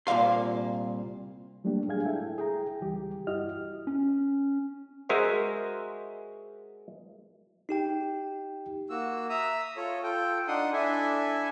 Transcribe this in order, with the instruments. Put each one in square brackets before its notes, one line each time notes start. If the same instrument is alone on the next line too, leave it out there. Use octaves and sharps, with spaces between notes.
[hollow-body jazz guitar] C2 A#2 G#3 F5 C6
[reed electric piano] F#3 G3 A3 A#3 D4 G4
G#2 D4 G#4 F5 G#5 G#6
E4 A4 E5 G5
G#4 G5 A#5
C#2 E3 G3 G4
G2 E4 F#4 G4 D#5 F6
[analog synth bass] C#4
[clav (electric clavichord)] G#3 F#4 G#4 A#4 C5 E5
[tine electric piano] D#4 G4 G5
[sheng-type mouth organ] A#3 F#4 E6
E5 A#5 D#6 E6
F4 A4 C#5
F4 A4 G5
D4 D#4 F#5 C6 D#6
D4 E4 A4 E5 G#5